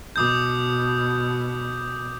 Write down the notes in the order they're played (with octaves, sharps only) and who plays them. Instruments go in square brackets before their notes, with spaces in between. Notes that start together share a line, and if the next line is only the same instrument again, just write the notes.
[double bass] B2 [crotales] D6 D#6 G6